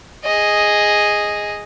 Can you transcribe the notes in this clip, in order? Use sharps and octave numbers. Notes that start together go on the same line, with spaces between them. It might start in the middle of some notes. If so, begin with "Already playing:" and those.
G#4 D#5